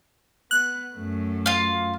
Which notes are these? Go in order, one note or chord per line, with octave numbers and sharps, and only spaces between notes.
B3 F#6
F#2 A3
F4 F5